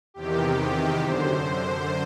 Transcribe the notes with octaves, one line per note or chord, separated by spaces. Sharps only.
E2 C3 D#3 G4
F#2 D3 C5